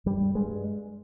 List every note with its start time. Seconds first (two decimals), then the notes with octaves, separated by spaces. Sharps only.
0.06 G2 G3
0.35 G2 G#3